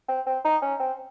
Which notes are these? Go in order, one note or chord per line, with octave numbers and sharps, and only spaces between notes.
C4
C4
D#4
C#4
C4